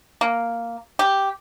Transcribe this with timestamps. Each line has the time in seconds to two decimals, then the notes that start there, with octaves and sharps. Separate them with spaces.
0.21 A#3
0.99 G4